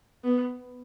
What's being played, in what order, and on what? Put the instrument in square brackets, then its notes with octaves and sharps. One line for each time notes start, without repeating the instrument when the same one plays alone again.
[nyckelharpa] B3